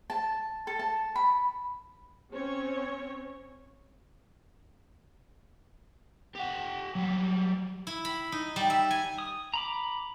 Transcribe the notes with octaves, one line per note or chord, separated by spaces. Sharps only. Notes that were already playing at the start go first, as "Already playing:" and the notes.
A5
A4
A5
B5
C4 C#4 C#5
G4 F#5
F#3 G3
E4
B5
D#4
G3
E5
G#5
D#6
A#5 B5 D6